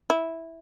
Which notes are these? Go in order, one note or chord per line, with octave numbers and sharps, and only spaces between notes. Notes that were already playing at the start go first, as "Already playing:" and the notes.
E4